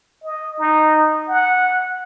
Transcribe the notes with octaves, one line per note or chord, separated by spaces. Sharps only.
D#5
D#4
F#5